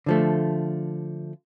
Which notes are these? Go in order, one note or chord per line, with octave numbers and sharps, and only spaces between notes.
D3 F3 A3